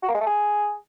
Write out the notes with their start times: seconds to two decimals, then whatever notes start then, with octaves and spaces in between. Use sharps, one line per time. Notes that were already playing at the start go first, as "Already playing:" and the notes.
0.02 F#4
0.08 A#3
0.14 G#3
0.20 A3
0.26 G#4